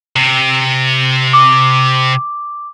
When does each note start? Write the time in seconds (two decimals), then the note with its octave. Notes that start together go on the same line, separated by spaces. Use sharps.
0.16 C3
1.33 D6